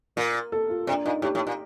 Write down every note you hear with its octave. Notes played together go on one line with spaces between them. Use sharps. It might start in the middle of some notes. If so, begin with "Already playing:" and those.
A#2 A#4
A4
F4
C3 D4
A#2 D#4
A2 G4
A2
A#2